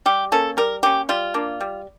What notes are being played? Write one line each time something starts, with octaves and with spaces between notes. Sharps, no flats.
G3 G4
A#3 C#4 A4
G3 A#4
A#3 C#4 G4
G3 F4
A#3 D4
G3